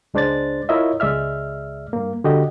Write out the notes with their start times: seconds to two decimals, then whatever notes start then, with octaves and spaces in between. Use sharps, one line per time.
0.14 C#2 G#3 D4 C5 D5 A6
0.69 E4 F4 A#4 C#5 D#5 E5
1.00 C#2 G#3 D5 E5 F6
1.93 G2 A#3
2.24 D3 F#4 G4 D#5